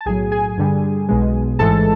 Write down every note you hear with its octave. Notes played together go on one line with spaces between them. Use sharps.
A5
B1 A2 F#3 G#4 G#5
G#4 G#5
G2 D3 G3
B1 B2 G#3
A1 G#2 E3 G#3 A4 A5